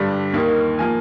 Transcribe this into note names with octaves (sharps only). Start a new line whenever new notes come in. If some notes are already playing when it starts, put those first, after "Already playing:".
Already playing: G2 D3 G3
D#2 D#3 A#3
F3 A#3 G#5